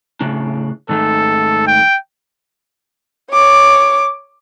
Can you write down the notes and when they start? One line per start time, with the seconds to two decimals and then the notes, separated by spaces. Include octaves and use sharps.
0.21 A2 C#3 D4
0.89 G#2 D#3 A3 A4
1.67 G5
3.32 C#5 D6